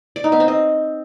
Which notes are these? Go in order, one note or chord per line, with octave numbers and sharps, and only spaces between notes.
D5
D#4
B3
C4
D#5